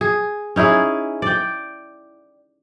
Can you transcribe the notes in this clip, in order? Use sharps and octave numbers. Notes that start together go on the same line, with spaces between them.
G#4
C#4 D#4 E4 G#4
D5 G5